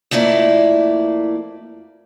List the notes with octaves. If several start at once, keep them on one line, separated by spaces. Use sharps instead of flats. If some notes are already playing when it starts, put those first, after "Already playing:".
F2 A3 A#3 E4 D5